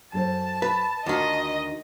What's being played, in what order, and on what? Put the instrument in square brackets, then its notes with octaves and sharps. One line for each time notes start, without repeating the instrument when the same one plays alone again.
[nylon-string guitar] F#2 A4 C5 [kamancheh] A5
[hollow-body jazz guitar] B4
[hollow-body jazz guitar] D2 D#3 [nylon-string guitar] F4 F#4 [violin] D#5